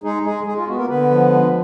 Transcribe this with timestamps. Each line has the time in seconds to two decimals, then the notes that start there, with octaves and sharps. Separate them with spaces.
0.04 G#3 D#4 G#4
0.25 G#3 G#4
0.46 G#3 G#4
0.58 F4
0.68 B3 F#4
0.78 A#3 A#4
0.89 D3 B3 B4
1.11 F3
1.32 G#3